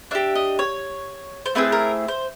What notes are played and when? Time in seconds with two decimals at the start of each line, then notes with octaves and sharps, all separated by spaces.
0.11 D4 G4 E5
0.36 D#5
0.59 C#5
1.46 C5
1.55 A3 C4 E4 G#4 B4
1.72 A#4
2.08 C5